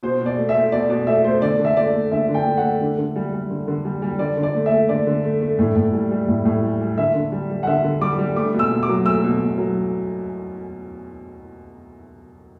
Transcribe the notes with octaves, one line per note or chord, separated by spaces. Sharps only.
B2 C5
B2
D5
A3
E5
A3
B2 D5
B2 D5
A3 E5
A3 C5
D3 D5
D3
E5
A3 D5
A3
D3 E5
D3
G5
A3
F#5
A3
D3
D3
G3
G3
D3
D3
G3
G3
D3 D5
D3
D5
A3
E5
A3
D3 D5
D3
A3
A3
A2
A2
G3
G3
A2
A2
G3
G3
D3 E5
D3
G3
G3
F#5
D3 E5
D3
G3 D6
G3
A3 D6
B2
E6
B2
D6
F#3
A3 E6
B2
B2
F#3